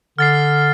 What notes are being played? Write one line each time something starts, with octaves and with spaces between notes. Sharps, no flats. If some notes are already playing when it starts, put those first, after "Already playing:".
D3 F6 A6 C7